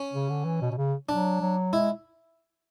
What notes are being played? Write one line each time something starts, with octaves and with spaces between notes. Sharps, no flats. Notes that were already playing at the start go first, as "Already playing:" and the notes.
Already playing: C#4
C#3
D3
E3
B2
B2
C#3
F#3 D4
F#3
G#3 E4